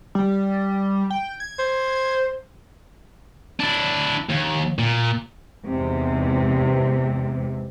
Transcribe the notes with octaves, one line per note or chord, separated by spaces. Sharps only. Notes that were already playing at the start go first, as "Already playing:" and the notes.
G3
G5
G#6
C5
D4 E4
D#2
A#2
E2 G#2 C3